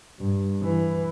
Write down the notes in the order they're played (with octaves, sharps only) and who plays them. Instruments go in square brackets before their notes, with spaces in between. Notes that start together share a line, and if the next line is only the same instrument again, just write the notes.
[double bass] G2
E3